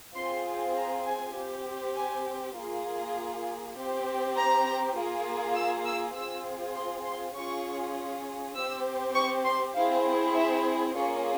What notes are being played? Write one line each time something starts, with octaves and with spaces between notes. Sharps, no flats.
C4 F4 G#4 C6
A#5
G#5
C4 G4
G#5
A#3 F4 G#4
C4 G4
A#5
A#3 F4 G#4
E6
E6
C4 F4 G#4 E6
C6
C6
C#4 F4 G#4 C#6
C4 G4 E6
C#6
C6
C4 E4 G#4 F5
E5
A#3 C#4 F4 G#4 C#5